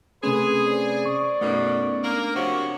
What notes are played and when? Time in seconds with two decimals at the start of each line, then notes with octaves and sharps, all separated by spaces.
0.23 C3 A3 C4 C#4 G#4 B4
0.67 C5 D5
1.06 C#6
1.41 F#2 B2 A3 B3 C#4 D#4
2.04 A#3 D4 A#4 D6
2.36 C3 F3 F#4 C#5